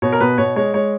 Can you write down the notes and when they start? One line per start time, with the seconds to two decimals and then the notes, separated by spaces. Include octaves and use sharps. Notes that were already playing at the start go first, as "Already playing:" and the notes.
0.02 B2 C#5
0.12 A#4
0.20 B2 B4
0.38 B2 C#5
0.56 G#3 C#5
0.74 G#3 C#5